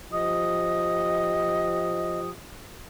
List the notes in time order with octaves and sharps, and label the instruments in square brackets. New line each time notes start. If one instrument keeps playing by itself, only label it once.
[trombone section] F3 G4 [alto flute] D#5 [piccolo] D#6